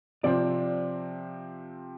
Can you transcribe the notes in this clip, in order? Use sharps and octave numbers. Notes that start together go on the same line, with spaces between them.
C3 F3 C4 D5